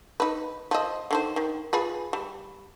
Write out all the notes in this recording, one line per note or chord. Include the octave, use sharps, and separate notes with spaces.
D#4 B4
F3 D#5
D3 D#3 C5
D#3
F4 G#4 B4
G3